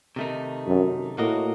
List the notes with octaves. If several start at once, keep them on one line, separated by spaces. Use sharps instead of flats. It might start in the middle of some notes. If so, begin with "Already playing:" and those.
C3 D#3 A3 D#4
F#2
A2 A#3 F#4 A#4 D#5